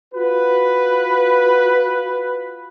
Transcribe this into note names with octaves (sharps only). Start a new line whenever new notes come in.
F4 F#4 B4